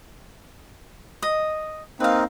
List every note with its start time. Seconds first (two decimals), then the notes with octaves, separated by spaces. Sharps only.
1.22 D#5
2.00 A#3 C4 D#4 B4 F5